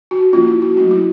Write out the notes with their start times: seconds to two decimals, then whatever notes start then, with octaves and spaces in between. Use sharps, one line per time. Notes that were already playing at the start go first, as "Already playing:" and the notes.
0.11 F#4
0.33 F3 A#3 C#4 F4
0.47 E4
0.62 F#4
0.76 F#3 A3 C#4 F#4
0.91 E4